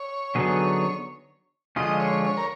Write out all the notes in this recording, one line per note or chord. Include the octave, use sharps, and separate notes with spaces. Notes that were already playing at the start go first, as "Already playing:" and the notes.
Already playing: C#5
D3 F#3 B3 D#4 G#4
D3 F3 G#3 C#4 F4 D#5
C#5
C#5
A#4